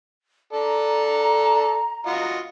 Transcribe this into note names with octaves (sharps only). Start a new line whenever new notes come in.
A4 D5 A#5
F4 F#4 D#5